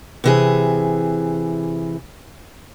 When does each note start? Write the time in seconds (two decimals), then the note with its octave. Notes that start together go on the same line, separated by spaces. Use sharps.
0.24 C3 E3 G#4